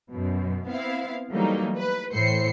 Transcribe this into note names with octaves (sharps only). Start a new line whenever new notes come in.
F#2 B2
B3 C4 E4 F5
E3 F#3 G3 A3 A#3 D#4
B4
A2 E3 C5 C7 C#7